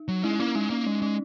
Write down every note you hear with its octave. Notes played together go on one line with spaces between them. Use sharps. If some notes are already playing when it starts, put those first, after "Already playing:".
Already playing: D#4
F#3
G#3 C#4 E4
A#3 C#4 E4
G#3 D#4
A#3 C#4
G#3 C#4
G#3 C#4